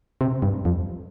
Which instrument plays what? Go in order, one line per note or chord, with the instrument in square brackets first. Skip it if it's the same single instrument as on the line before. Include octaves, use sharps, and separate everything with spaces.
[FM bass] C3
G2
F2